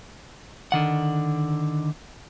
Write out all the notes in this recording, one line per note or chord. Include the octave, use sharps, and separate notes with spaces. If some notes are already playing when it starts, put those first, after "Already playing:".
D3 D#3 F#5